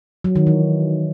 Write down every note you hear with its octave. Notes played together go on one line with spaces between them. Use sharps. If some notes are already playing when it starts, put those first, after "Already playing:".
F#3
D#3
E3